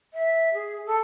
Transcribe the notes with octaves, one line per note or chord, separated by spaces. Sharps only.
E5
G#4
A4